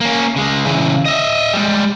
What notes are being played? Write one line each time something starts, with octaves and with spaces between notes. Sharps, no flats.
A#3 C#4
C#3 G#3
C#3 E3
D#5 E5
G3 G#3